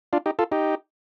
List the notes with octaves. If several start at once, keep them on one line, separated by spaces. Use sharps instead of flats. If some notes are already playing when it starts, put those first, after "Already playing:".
D4 F4
D#4 G4
F4 A4
D#4 G4